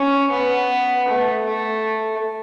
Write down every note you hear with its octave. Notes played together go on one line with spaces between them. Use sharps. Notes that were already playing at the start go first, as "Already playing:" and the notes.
Already playing: C#4
B3
A3
A3